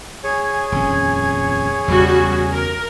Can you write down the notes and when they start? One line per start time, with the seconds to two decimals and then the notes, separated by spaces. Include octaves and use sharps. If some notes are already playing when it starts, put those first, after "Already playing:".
0.24 G#4 C#5 G#5
0.72 D#1 F2 C#4
1.88 E2 C#3 G3 F#4
2.53 A#4